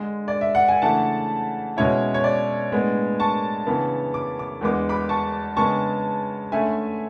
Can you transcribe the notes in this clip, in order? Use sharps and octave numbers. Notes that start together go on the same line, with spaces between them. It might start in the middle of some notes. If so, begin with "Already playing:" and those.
Already playing: D3 G#3 D4
D5
E5
F#5
G#5
C#3 E3 A3 D4 F#5 A5
B2 G#3 C#4 E4 C#5
C#5
D5
A2 G#3 B3 D4
A5 C#6
C#3 E3 B3 D4
D6
D6
E2 D3 G#3 B3 D6
B5 D6
A5 C#6
C#3 G#3 B3 D4 A5 C#6
D3 A3 C#4 E5 G#5